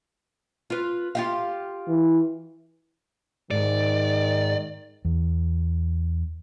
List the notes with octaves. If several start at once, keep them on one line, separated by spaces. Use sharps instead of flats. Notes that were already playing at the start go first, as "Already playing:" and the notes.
F4 B4
F4 G4 F5
E3
G#2 D#3 D5
E2